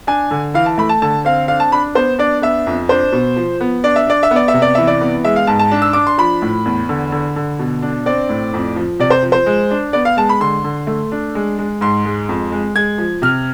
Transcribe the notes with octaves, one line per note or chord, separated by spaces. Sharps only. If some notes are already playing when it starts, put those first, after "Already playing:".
D4 G#5
D3
E3 F5
A5
A3 B5
A5
D3 A5
C4 F5
D4 F5
A5
D4 B5
B3 C5
D4 D5
B3 E5
F2
D4 C5
B2
F3
B3
D4 D5
E5
D4 D5
E5
B3
D5
E5
C3
D5
E3 E5
D5
B3
G#3 E5
F5
G#2 A5
A5
D4
E6
D4 D6
C6
F3 B5
A2
E2
D3
D3
D3
B2
D4
C4 D5
A2
F2
F3
C3 D5
C5
F3
C5
G#3
D4
B3 D5
F5
G#3 A5
B5
D3 C6
D3
A3
D4
G#3
G#3
G#2 C6
G#3
F2
G#3
G#3 G#6
F3
C3 F6